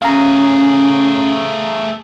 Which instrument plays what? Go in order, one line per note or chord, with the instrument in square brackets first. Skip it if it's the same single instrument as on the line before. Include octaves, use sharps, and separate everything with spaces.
[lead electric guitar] A3 G#4 [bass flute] C#4 [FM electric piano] F5 A#5